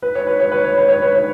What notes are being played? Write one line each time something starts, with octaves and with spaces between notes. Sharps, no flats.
B4
C#5
B4
C#5
B4
C#5
B4
C#5
B4
C#5